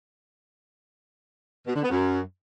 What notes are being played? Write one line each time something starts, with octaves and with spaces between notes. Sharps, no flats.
B2
D3
B3
F#2